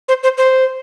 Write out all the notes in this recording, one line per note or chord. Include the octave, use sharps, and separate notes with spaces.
C5
C5
C5